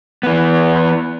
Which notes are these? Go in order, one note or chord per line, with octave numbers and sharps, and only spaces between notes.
E3 B3